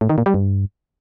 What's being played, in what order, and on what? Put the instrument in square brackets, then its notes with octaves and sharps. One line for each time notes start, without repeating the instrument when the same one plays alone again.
[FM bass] A2
D#3
A#2
G3
G2